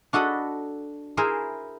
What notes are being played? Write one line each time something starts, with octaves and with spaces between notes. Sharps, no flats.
D4 F#4 A4 D#5 B5
E4 G#4 A#4 C5 E5